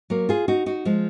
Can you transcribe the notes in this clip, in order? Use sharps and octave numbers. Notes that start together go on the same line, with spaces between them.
F#3 A#3
F4 G#4
D#4 F#4
D#4 F#4
F3 G#3